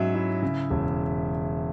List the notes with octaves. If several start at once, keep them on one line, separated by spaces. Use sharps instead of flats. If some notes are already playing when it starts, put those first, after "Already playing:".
Already playing: G#2 F#3 C#4 E5
E4
C#3
E1